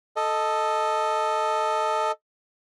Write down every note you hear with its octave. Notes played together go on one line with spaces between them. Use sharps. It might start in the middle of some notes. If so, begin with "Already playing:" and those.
A4 D#5